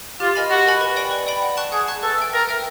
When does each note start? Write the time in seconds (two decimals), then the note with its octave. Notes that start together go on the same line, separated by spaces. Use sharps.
0.20 F4 G4
0.36 A#4 D#5 G#5 B5
0.50 F#4 G4
0.66 A#4 D#5 G#5 B5
0.81 B4
0.96 D5 G5 B5
1.11 B4
1.27 D5 G5 B5
1.42 F#5
1.57 A5 C#6 F#6
1.72 G#4 F#5
1.88 A5 C#6 F#6
2.03 A4 B4
2.18 E5 G5
2.33 A#4 B4
2.49 E5 G5